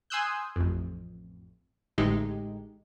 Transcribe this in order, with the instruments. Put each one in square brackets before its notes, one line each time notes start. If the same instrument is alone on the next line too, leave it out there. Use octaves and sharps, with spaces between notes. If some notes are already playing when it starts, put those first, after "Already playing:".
[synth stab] G#5 C6 D#6 E6 F#6 G6
A1 F2
A1 A2 D3 G#3 D#4 G4